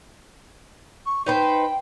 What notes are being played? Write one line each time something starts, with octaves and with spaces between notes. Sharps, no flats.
C#6
D#4 B4 C5 G5